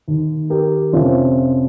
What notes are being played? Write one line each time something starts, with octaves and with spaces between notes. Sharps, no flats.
D#2 D#3
G4 A#4
F2 C3 F3 C#4 F4